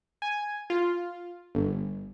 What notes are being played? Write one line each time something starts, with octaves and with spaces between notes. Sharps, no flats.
G#5
F4
G1